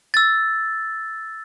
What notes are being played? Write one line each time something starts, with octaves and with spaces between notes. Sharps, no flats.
E6 A6